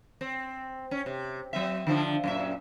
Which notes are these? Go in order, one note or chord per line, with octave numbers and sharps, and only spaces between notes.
C4
C#4
C3
F#3 C4 E5
D3 F3 D4
F#2 A#2 E5